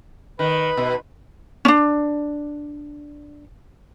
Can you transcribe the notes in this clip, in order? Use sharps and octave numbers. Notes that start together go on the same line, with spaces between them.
D#3 B4
B2
C#4 D4